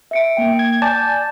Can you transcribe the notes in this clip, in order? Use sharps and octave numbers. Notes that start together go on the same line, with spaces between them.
E5 C#7 D7
A#3 G5
G#6
D5 G#5 A5 G6